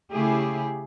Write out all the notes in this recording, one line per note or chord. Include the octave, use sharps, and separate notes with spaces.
C#3 A3 E4 G4 G#4